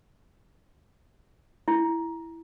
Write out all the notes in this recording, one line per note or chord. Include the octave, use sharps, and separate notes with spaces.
E4